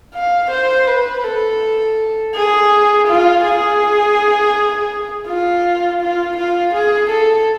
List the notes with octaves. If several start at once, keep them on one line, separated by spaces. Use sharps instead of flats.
F5
C5
B4
A4
G#4
F4
G#4
F4
F4
F4
G#4
A4